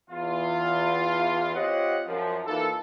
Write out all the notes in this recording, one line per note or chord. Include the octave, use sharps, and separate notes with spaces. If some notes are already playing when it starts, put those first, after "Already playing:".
E2 F4
C4 F4 G4 C#5 D#5 F#5
F#2 F3
E3 A#3 D#4 F4 A4